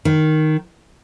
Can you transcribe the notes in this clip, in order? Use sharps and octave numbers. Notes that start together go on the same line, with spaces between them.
D#3